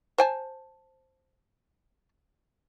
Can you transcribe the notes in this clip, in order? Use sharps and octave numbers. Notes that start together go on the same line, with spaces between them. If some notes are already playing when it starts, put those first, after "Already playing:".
C5 G#5 A5